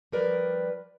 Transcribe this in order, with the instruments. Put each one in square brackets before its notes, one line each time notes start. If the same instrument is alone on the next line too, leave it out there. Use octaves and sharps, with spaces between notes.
[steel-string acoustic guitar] F3 G3 A#4 B4 D5